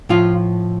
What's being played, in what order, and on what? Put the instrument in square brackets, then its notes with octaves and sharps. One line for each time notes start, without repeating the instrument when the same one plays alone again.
[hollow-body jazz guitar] A2 F3 F4